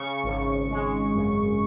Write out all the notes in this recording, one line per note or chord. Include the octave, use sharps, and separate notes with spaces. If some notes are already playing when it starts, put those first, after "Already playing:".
Already playing: C#3 C#6
G#1
G#3
F#2